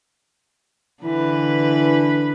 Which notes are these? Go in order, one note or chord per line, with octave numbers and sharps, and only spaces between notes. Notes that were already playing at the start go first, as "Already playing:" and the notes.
D3 E3 B4